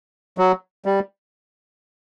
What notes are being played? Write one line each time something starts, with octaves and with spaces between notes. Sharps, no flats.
F#3
G3